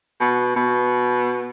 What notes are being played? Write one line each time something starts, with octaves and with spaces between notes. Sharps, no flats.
B2
B2